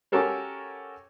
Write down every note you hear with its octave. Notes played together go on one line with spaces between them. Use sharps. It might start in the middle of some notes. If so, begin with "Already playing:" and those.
C#4 F#4 G4 A4 A#4 C#5